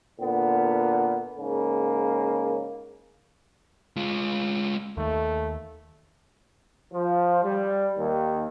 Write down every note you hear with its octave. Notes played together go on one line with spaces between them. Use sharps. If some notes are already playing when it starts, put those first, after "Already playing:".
A#2 D3 B3
G#2 C#3 A#3
G#3 F4
D#2 A3
F3
G3
D#2